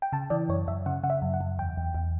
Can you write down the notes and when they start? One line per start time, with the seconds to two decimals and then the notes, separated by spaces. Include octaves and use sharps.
0.02 G5
0.12 C#3 A5
0.30 E3 D5
0.49 F#2 C#5
0.67 F#2 E5
0.86 C#3 F#5
1.03 C#3 F#5
1.10 E5
1.22 F#2
1.34 F#5
1.41 F#2
1.59 E2 G5
1.77 E2
1.94 E2